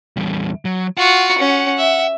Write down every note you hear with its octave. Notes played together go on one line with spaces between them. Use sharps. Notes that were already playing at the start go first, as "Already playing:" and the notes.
E2 G3
F#3
F4 F#4 F#5
C#4
E5